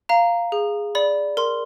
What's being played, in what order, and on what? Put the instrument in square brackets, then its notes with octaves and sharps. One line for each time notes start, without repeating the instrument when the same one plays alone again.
[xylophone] F5 A#5
G#4
D5 B5
A#4 C6